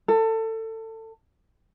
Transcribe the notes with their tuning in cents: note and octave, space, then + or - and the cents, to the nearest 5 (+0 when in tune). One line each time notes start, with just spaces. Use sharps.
A4 +25